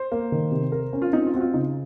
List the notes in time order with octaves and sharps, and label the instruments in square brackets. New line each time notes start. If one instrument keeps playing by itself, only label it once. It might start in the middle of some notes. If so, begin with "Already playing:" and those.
Already playing: [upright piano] C5
[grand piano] A#3
D#3
C3
A#4
C#4
[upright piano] F4
[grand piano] C4 [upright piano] D#4
[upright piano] F4
[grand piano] C4 [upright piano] F#4
[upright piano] F4
[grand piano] C#3 [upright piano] D#4